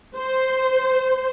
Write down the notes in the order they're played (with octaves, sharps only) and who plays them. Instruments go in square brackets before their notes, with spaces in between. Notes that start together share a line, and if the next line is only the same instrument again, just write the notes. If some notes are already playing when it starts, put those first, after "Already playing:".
[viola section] C5